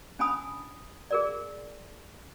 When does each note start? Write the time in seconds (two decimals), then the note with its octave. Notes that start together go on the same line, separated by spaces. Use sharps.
0.19 C#4 D4 G#5 A5 B5 D#6
1.11 G#4 A#4 D5